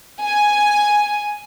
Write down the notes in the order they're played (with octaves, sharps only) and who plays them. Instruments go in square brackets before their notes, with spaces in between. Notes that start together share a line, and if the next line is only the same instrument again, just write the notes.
[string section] G#5